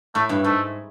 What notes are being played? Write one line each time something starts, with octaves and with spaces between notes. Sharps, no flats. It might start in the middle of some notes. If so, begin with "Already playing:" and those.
A2 A3
G2
G#2 A3